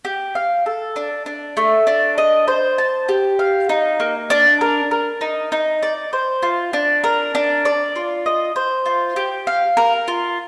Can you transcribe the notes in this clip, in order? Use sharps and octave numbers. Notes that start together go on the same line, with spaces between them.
G4
F5
A4
D4
D4
A3
D4
D#5
C5
A5
G4
F5
D#4
A#3
D4
A#4
A#4
D#4
D#4
D5
C5
F4
D4
A#4
D4
D5
F4
D#5
C5
F4
G4
F5
A#4
F4